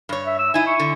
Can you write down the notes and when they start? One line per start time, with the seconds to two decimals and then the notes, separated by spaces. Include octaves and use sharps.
0.09 G2 C#5
0.26 E5
0.39 E6
0.54 D#4 E4 G#5
0.67 C#6
0.79 D3